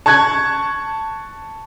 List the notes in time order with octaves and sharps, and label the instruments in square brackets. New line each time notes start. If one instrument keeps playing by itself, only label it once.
[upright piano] A5 C#6 F#6 G#6